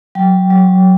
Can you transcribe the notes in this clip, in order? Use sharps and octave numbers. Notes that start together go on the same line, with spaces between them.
F#3 G5
F#3